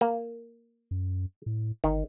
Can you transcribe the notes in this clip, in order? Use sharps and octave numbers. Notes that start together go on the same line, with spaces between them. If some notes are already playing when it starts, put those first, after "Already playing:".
A#3
F#2
A2
G1 D#3